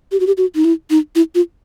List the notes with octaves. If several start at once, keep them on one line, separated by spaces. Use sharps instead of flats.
G4
F#4
G4
F#4
D#4
E4
D#4
E4
F4